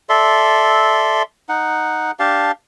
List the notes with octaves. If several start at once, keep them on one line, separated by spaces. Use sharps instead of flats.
A4 D5 E5 C6
D#4 F#5
D4 G4 F5 A5